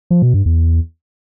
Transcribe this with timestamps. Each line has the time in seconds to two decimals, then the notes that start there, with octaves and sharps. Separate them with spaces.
0.10 F3
0.22 B2
0.34 G2
0.46 E2